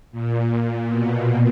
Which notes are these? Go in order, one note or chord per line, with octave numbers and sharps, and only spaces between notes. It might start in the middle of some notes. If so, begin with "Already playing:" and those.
A#2
B2